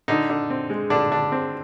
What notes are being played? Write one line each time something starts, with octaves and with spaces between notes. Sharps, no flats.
D3 D#4
D3
C4
G#3
D3 D4
D3 D4
C4